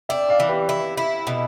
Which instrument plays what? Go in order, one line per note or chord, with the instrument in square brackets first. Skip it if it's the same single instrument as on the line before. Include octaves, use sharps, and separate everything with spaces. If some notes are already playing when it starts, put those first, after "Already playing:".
[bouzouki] D4 [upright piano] E5 G5
[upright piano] D5 F5
[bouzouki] E3
[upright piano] G4 B4
[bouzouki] E4
E4
B2